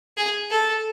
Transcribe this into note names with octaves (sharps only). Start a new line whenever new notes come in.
G#4
A4